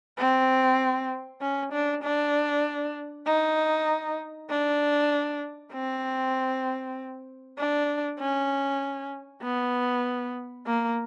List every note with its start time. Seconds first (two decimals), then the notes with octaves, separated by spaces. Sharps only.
0.18 C4
1.41 C#4
1.73 D4
2.04 D4
3.26 D#4
4.50 D4
5.73 C4
7.58 D4
8.19 C#4
9.43 B3
10.67 A#3